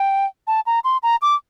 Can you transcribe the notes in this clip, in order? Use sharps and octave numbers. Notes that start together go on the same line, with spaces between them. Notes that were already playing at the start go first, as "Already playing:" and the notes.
Already playing: G5
A5
A#5
C6
A#5
D6